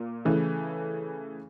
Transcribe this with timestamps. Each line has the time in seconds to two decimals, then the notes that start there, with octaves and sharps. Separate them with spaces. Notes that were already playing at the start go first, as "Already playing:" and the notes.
Already playing: A#2 A#3
0.25 C#3 E3 A3